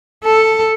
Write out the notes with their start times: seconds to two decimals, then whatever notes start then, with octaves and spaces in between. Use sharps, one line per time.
0.24 A4